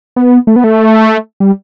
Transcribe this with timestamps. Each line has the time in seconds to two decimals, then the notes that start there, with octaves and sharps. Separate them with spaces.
0.16 B3
0.47 A3
0.56 B3
0.64 A3
1.40 G3